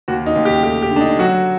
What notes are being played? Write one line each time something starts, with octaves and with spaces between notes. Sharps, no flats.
D#2 F#4
D#4
D#2
G4
A3 G4
G4
D3
D4
D#4
F#3 F#4